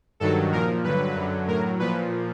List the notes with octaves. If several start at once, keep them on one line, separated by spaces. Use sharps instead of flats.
G2 D#3 F#3 A4
A#2 F3 A#4
G2 D3 F#3 B4
F#2 D3 F#3
A2 F#3 A#4
A#2 F3 B4